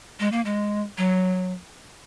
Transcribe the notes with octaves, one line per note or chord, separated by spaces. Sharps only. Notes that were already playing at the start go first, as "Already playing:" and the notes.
G#3
A#3
G#3
F#3